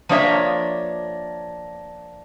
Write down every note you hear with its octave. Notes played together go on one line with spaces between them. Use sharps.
F3 A#3 D4 C#5 E5